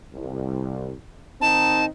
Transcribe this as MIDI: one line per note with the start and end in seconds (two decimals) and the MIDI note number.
0.14 0.92 36
1.41 1.87 51
1.41 1.87 60
1.41 1.87 63
1.41 1.85 81